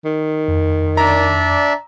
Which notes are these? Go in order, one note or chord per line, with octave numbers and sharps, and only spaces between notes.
D#3
F2
D4 D5 E5 A#5